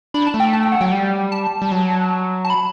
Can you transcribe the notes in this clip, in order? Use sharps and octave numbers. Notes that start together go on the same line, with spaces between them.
D4 B5
A5
A3
G5
A5
G5
F#5
F#3 G5
G3
A5
G3
F#3
A5
B5